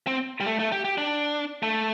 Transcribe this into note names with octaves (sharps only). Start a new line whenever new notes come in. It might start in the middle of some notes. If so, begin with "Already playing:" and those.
C4
G3
A3
A3
G4
G4
D4
A3